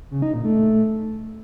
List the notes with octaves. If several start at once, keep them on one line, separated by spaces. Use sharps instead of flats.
C#3
D#4
A#2
A3